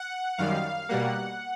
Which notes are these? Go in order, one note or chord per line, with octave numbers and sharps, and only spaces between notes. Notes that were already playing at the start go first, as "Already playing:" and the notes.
Already playing: F#5
F#2 D#3 G3 F5
B2 G3 A#3 F#5